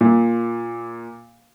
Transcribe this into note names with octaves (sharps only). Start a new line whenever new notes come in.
A#2